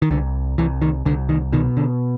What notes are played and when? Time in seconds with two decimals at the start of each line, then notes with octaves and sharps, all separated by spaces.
0.02 D#3
0.10 C2 D3
0.58 C2 E3
0.82 D#3
1.05 C2 D3
1.29 D#3
1.52 B2 D#3
1.77 D3